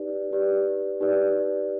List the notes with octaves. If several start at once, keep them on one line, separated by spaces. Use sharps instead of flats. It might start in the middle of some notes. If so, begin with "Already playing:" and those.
Already playing: D#4 G4 B4 D5
D#4 G4 B4 D5
D#4 G4 B4 D5